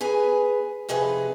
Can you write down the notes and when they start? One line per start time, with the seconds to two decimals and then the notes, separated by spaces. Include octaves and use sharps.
0.01 G#4 B4 G#5 A#5
0.89 F2 C3 D#4 G#4 B4